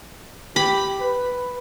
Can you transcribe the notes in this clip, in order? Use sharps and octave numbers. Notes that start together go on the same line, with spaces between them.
G4 B5
B4